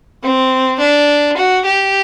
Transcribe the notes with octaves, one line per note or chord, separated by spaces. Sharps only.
C4
D4
F#4
G4